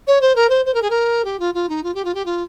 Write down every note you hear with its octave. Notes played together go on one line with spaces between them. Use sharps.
C#5
C5
A#4
C5
C5
A#4
G#4
A#4
G4
F4
F4
D#4
F4
G4
F4
G4
F4